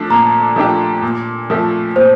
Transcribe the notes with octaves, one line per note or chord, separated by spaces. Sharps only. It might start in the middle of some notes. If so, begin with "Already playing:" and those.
Already playing: F3 A3 D4
A#2 A#5
F3 A3 D4 G4
A#2
F3 A3
A#2 C5